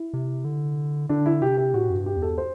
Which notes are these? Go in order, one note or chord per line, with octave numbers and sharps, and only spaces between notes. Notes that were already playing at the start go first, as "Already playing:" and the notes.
Already playing: E4
C3
D3
D3 D4
E4
C3 G4
G4
A2 F#4
F#2
G2
G4
E2
A4
C5